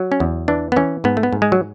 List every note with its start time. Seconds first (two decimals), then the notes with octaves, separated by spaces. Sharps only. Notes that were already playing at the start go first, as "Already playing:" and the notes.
Already playing: F#3
0.12 C#4
0.20 E2
0.48 E3 D4
0.72 B3
0.76 E3 C#4
1.04 G#2 B3
1.17 A3
1.23 B3
1.33 G#2
1.42 G#3
1.52 F#3